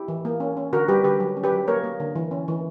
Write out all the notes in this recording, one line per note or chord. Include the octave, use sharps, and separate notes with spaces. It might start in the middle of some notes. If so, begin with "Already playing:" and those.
Already playing: E4 G4
E3
A#3
C#4
C#4
D3 F#4 A#4
G3 G4 B4
D3 G4 B4
F#3
C#4
G4 B4
F#3
A#3 A#4 C#5
A#3
D3
E3
C#4
E3